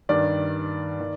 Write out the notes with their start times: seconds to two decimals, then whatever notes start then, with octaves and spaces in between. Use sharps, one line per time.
0.09 G2 D#3 D5
1.00 D#3